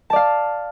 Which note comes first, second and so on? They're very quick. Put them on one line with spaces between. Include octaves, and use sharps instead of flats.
A5 D5 F5